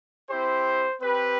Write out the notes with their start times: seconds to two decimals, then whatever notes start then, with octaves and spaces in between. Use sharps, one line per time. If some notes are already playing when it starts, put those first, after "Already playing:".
0.28 C4 E4 G4 C5
1.01 C4 G4 B4